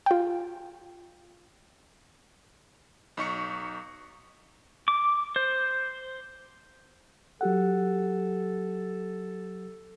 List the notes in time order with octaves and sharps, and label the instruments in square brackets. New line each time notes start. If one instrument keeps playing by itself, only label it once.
[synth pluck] F4 G5
[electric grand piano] B1 D#4 C#6 C#7
[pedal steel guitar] D6
C5
[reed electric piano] F#3 G4 F#5 [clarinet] A4